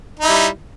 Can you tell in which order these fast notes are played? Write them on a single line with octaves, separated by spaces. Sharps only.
D#4 E4 G3